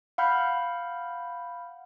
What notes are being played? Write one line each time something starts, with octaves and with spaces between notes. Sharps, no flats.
F5 F#5 B5 F6 G6